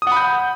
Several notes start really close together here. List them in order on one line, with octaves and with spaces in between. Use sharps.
D#6 F#5 B5 G6